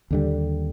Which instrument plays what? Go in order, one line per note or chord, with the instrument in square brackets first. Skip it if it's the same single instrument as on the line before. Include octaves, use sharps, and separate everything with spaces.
[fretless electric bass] D#2 D3 G3